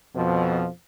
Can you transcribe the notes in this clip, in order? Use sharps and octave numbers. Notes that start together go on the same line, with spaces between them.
F2 B2 F3